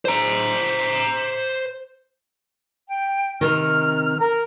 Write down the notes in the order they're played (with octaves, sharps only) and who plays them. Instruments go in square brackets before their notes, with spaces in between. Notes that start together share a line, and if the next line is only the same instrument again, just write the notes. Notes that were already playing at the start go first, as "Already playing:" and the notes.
[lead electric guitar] C5 A#5
[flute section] G5
[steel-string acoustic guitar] C3 D#3 [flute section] F6
[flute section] A#4